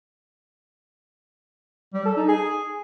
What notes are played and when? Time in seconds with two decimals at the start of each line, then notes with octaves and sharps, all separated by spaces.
1.94 G3
2.05 A4
2.17 D#4
2.28 G#4